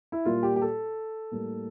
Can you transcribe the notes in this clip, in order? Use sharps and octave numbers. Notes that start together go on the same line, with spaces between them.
E4
A#2 G3 A#3 F4
G4
G4
A4
A2 G3 A#3